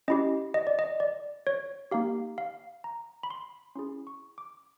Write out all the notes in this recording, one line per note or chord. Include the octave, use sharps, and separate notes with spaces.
C#4 E4 G4 D#5
D#5
D5
D#5
D5
C#5
A#3 D#4 G4 F5
F5
A#5
B5
C6
C#4 E4 G#4 C6
C#6
D6